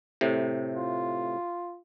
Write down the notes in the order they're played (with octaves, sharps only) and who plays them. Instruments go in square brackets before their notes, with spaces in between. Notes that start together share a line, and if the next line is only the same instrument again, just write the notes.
[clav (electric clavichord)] A2 C3
[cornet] F4